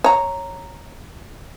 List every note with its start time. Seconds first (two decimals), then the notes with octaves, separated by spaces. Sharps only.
0.04 C#5 A#5